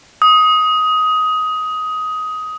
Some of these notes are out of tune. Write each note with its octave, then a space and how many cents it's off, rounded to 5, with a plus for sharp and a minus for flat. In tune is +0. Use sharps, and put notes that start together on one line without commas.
D#6 +15